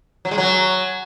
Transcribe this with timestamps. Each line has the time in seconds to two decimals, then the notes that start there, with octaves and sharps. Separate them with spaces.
0.25 F#3
0.31 G#3
0.38 F#3